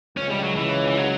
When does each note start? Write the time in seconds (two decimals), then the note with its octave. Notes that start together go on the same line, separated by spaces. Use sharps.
0.17 C#2 C#3 C#4
0.31 G3
0.43 F#3
0.56 E3
0.88 E3
0.97 F#3